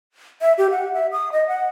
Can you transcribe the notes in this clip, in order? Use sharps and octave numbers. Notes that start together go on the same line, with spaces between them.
E5
G4
F#5
E5
D#6
D#5
F#5